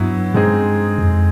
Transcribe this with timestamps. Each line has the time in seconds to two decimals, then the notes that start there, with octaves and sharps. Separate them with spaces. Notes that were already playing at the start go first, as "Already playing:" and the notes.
Already playing: G2 F#3 B3 E4
0.34 G2 G#3 C4 D#4 G#4
0.98 F2